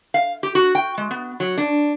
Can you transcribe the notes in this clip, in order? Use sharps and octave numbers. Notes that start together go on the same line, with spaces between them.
F5
G4
F#4
G5
G#3
B3
F#3
D4